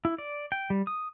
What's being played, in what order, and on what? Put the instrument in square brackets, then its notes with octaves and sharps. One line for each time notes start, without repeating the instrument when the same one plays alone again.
[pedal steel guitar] E4
D5
G5
G3
D#6